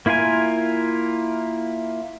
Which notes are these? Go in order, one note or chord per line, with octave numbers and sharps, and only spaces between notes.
A#3 E4 F4 A#4 G#5